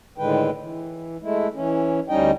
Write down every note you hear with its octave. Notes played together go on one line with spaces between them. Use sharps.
A2 D3 D#3 G#3 B4 G5
E3
G#3 A3 E4
E3 C#4
D2 G3 C#4 D#4 D#5 G5